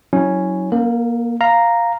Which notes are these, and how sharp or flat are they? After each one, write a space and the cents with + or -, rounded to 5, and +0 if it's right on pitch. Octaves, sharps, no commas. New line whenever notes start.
F#3 +0 C#4 +0 E4 -35
A#3 +20 A#4 -35
F5 +0 A#5 +0